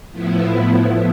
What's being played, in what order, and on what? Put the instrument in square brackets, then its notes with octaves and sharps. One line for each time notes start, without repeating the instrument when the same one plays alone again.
[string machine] A2 F3 B3 E4